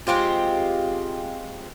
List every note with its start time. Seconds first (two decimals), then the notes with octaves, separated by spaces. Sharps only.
0.07 G#3 C4 F4 G4